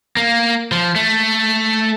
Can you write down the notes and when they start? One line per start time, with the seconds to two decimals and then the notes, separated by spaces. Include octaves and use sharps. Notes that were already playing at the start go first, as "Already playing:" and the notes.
0.17 A#3
0.72 F3
0.96 A3